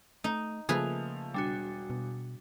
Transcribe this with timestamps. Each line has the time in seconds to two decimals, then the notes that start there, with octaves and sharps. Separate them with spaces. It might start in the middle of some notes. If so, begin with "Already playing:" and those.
0.24 A3 D#4
0.69 C#3 F3 A3 A#3 G#4 B4 F7
1.34 E1 G3 D4 F#4
1.90 B2